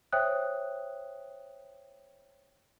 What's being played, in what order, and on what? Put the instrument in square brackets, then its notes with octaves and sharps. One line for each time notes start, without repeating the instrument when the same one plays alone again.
[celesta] C5 C#5 E5 G5 D#6 F#6